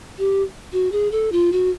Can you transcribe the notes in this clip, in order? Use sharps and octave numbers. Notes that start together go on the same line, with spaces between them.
G4
F#4
G#4
A4
F4
F#4